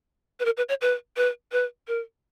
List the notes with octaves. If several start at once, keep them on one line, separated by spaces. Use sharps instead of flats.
B4
A#4
B4
C#5
B4
B4
B4
A#4